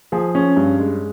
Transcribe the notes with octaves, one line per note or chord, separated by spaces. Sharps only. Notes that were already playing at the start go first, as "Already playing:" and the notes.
F3 G#4
C#4
G2
G#3